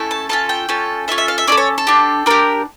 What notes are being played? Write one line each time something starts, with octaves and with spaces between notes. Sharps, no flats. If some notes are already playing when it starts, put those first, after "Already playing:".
Already playing: A3 C#4 E4 A4
A5
C#4 F4 A4 A5
G5
C#4 F4 A4
C#4 F4 A4 E5
E5
F5
E5
C#4 F4 A4 D5
C#5
A4
D4 G4
D4 G4 A#4